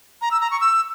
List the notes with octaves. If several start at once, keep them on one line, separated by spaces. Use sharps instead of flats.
A#5
E6
A#5
C#6
E6